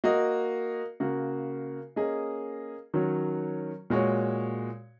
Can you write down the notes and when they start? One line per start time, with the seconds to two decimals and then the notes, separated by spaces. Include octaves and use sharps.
0.04 A#3 F#4 D#5
1.00 C#3 A#3 F#4
1.96 A#3 C#4 G#4 D#5
2.94 D#3 F#3 C#4 F#4 C#5
3.90 A#2 G#3 F#4 C#5